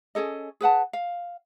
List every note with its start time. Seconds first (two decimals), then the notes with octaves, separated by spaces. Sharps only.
0.15 C#4 G#4 A4 D#5
0.61 G#4 B4 F#5 A5
0.93 F5